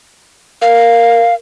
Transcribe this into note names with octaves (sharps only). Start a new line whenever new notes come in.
A#4 F5